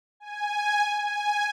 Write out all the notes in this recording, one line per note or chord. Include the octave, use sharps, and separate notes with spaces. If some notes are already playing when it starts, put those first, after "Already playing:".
G#5
G#5